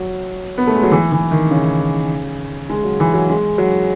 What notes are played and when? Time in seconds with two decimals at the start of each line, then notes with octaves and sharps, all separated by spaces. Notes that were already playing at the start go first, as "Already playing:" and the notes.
Already playing: F#3
0.58 B3
0.67 A3
0.75 G#3
0.83 F#3
0.92 E3
1.12 E3
1.31 D#3
1.51 C#3
2.70 G#3
2.84 F#3
3.00 E3
3.14 F#3
3.29 G#3
3.58 F#3